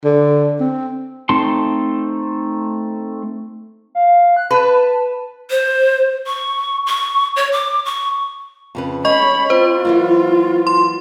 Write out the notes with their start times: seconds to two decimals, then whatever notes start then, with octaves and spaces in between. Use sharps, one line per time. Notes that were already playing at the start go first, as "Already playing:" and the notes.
0.05 D3
0.60 C4
1.29 A3 C4 D#4 A5 C6
3.95 F5
4.37 F#6
4.51 B4 A5
5.50 C5
6.27 C#6
6.87 C#6
7.36 C#5
7.53 D6
7.85 C#6
8.75 F2 C#3 B4
9.05 C#4 G#4 C#5 D#5 B5 C#6
9.50 C4 F4 C5
9.85 E3 F#3 A#3
10.67 C6